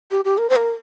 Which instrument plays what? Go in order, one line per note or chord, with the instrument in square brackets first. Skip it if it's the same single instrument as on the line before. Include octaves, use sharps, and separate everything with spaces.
[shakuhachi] G4
G4
A#4
C5
A#4